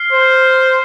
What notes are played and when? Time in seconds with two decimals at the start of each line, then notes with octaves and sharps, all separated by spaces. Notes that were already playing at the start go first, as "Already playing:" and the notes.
Already playing: F6 C7
0.12 C5